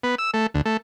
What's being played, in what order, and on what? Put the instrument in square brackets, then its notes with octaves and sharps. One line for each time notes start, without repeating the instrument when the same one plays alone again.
[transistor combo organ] B3
E6
A3
D2
A3